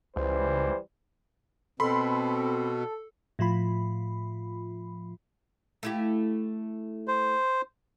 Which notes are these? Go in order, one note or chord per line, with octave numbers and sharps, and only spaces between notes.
C#2 E3 G3 C5
B2 C4 A4 B5 C6
A2 F3 F4 B5
A3 E4 G4
C5